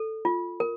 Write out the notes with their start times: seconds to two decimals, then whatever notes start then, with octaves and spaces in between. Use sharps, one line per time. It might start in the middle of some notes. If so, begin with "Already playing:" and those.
Already playing: A4
0.25 F4
0.60 A#4